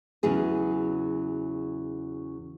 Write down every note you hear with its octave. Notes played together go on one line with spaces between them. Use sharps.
E2 C#3 F#3 G#4 B4